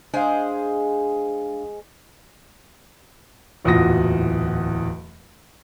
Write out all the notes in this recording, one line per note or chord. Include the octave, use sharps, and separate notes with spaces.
G#3 D4 G#4 C5 F5
D1 E2 A#2 F#4 D#6 A#6